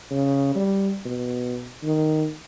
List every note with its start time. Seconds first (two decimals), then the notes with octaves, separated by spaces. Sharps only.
0.11 C#3
0.55 G3
1.05 B2
1.83 D#3